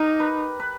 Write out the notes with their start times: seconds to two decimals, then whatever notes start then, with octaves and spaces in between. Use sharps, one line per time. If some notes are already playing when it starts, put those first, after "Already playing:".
Already playing: D#4 G4 A#4
0.20 B4
0.60 B4